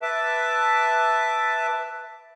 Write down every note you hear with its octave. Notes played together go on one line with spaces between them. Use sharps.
B4 E5 A5 D6